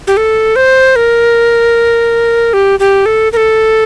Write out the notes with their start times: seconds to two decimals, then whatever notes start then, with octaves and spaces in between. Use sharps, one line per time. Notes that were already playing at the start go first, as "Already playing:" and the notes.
0.07 G4
0.17 A4
0.56 C5
0.96 A#4
2.53 G4
2.80 G4
3.06 A4
3.33 A#4
3.37 A4